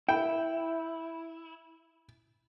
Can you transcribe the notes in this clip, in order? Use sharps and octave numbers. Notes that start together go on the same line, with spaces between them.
E4 G5